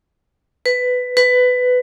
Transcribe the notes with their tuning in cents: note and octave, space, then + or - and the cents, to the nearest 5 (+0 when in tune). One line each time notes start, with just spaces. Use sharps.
B4 +10
B4 +15